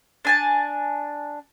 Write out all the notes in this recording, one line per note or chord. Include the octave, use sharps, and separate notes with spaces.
D4 G#5 A5